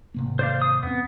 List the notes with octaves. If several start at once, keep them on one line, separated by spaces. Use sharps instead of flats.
G#1 C3 A#3
C5 D5 F5
D#6
E2 B3 C4